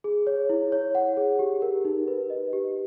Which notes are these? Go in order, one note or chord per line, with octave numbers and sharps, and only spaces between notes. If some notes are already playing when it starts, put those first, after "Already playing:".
G#4
C#5
E4
C#5
F#5
G#4
G4
A#4
D#4
B4
D#5
G4